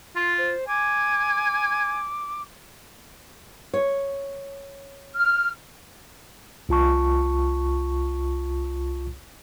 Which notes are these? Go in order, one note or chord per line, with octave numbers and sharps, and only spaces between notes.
F4 C6
C5
G#5 D6
C#5
F6
C2 F4 A5 C#6